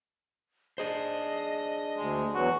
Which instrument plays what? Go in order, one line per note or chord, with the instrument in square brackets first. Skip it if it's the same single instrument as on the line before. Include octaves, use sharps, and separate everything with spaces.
[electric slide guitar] D4 G#4 C5 [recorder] D#5
[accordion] D2 [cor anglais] G#3
[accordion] E2 E3 F#3 [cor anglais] F#4